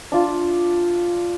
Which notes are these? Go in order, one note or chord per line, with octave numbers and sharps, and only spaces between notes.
D4 F4